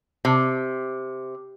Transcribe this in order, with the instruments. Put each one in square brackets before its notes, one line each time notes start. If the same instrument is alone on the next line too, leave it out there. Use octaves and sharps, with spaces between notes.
[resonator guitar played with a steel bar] C3